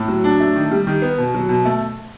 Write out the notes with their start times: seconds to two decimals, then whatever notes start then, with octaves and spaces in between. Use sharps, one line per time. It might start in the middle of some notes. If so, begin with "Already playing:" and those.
Already playing: A2
0.08 F#3
0.24 D4
0.40 A3
0.56 D#3
0.71 G3
0.87 D#3
1.02 B3
1.18 B2
1.34 F#3
1.49 B2
1.65 A3